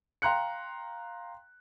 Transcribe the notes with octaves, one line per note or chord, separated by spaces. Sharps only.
F5 G5 A#5 C6 F#6 C#7